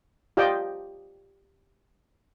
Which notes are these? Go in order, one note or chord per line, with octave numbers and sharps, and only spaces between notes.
F4 G4 D5 D#5 G5